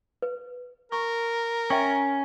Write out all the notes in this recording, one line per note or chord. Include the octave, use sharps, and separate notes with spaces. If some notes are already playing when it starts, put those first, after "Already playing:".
B4
A#4 C#6
C#4 E5 G5 C#6